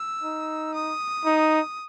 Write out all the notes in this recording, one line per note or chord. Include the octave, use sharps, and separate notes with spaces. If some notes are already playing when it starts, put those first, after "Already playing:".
Already playing: E6
D#4
D#6
D#4